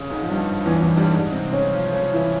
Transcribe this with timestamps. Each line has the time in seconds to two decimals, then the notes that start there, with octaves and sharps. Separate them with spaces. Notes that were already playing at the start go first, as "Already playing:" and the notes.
Already playing: C#3
0.10 G#2 G#3
0.22 F3
0.30 G2 G3
0.66 E2 E3
0.82 E2 E3
0.96 G2 G3
1.11 G#2 G#3
1.31 C3 C4
1.52 C#3 C#4
1.72 F3 F4
1.92 C#3 C#4
2.13 E3 E4